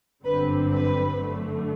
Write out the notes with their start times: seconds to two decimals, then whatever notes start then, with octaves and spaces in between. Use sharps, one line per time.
0.24 G1 F#2 D3 G3 C4 B4
0.70 B4
1.16 F#2 D3 A3